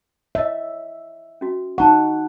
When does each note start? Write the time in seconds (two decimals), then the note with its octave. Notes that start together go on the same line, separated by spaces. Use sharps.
0.35 C#5 D#5 E5
1.41 C#4 F#4
1.78 D#4 F#5 A5 A#5 C#6